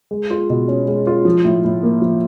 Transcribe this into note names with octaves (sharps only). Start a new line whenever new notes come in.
G#3
F4
B2
C#4
G#3
F4
F3
A2
A2
A#3
F3